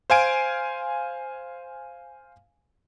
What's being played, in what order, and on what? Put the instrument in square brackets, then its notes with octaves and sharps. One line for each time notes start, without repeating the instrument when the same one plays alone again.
[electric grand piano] C5 F5 G#5 D7